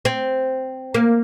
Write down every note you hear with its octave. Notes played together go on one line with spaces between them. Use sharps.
C4
A#3